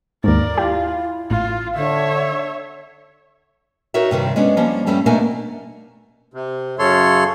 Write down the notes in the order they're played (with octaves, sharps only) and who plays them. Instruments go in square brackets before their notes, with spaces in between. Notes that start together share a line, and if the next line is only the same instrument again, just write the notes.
[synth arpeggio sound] D#2 G#2 [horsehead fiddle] A#4 D5
[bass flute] E4 [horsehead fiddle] F4 [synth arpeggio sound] G4
[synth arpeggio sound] A1 [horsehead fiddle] F4
[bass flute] D3 [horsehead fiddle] C#5 E5
[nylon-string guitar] D#4 F#4 A#4 C#5 E5
G2 C3 D#3
G#3 B3 C#4 D4
F3 G3 A#3 C#4
G2 G3 A3 C4 C#4
B2 A3 A#3 D4 A#4 G#5
[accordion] C3
F#2 C#3 A4 C#5 C6